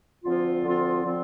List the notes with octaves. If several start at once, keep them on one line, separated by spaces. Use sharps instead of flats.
D2 D3 F3 C4 F4
D2 D3 F3 C4 F4
D3 F3 C4 F4